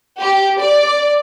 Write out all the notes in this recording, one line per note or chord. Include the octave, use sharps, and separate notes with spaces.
G4
D5